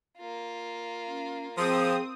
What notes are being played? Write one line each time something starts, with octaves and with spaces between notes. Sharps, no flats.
A#3 F4
C#4
F3 C4 G#4 D#6